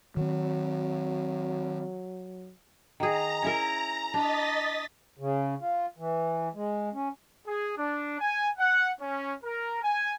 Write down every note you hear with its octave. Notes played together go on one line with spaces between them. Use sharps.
D#3 F#3 C4
D#3 G#4 A#5
C#4 E4 A#4
D4 D#5 A6 B6
C#3
F4
E3
G#3
C#4
G#4
D4
G#5
F#5
C#4
A#4
G#5